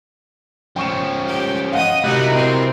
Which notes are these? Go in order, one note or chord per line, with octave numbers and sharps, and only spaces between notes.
F3 C#4 G5 C#6 E7
G4
D#5 F5 F#5 D#6
C3 D#4 E4 F#4 A#4 F#6
C4